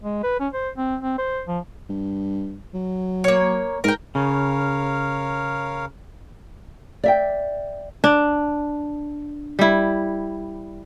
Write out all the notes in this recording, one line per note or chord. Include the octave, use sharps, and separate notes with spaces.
G#3
B4
C#4
C5
C4
C4
C5
F3
G2
F#3
A#3 C#5
G#2 A#4 G5
C#3 A#4 C#5 F5
D5 E5 G5
D4
G3 E4